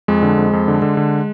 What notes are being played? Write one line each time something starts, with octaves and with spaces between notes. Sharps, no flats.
F2 G#3
D3
F2
F2
D3
D3
D3